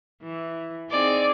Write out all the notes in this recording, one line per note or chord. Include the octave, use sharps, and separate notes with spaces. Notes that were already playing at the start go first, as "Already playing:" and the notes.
E3
C4 D#4 G#4 D5